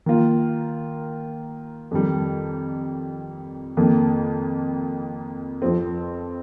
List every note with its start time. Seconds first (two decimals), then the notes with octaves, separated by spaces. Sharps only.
0.06 D#3 A#3 F4
1.91 F2 D#3 G3
3.77 F2 D#3 A#3
5.62 F2 F3 C4